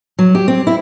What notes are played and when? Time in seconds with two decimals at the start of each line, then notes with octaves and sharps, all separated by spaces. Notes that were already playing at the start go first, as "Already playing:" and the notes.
0.19 F#3
0.35 G4
0.48 C4
0.67 E4